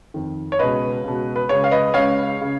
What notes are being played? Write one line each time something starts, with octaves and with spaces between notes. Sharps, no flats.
F2 D#3
C#5
C#2 B2 B4 D#5
C#2 B2
B4
C#2 C#3 C#5
F5
B4 D#5
C#2 C#3 C#5 F5
C#3